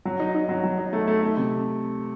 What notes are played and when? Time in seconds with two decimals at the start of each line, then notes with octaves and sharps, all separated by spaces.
0.05 F#3
0.20 D#4
0.35 D#4
0.49 F#3
0.64 F#3
0.78 D#4
0.93 A3
1.07 A3
1.22 A3
1.36 C3